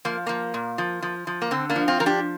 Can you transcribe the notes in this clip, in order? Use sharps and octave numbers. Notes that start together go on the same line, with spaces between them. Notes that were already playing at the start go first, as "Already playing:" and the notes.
F3 A#3
F3 A#3
A#2
F3
F3
F3
A#3
D3 C4
A#3 D4
F3
C4 F4
F3 A#4
D4 G4